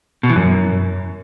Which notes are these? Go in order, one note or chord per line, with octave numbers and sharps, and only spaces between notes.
B2
E3
F#2